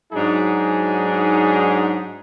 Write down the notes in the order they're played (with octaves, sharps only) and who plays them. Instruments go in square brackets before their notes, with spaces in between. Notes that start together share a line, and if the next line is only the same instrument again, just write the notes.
[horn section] G#2 F#3 D4 D#4 G#4